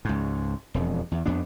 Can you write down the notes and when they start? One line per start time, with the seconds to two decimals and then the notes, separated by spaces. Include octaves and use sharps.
0.05 C#2 G#2
0.74 E1 F2
1.12 E2
1.26 F2 B3 D4